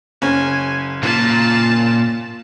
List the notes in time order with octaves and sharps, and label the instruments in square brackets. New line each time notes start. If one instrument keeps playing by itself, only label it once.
[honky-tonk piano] F#1 C#4 [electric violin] G#5
[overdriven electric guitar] A#2 [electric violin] F4 A5